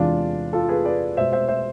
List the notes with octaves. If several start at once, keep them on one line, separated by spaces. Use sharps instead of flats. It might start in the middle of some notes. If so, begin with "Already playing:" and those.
Already playing: E2 C3 E3 G#3 D4 F4
F4 A4
G#4 B4
B4 D5
B2 G#3 C5 E5
C5 E5
C5 E5